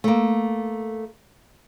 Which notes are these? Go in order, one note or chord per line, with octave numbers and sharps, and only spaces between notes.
A3 A#3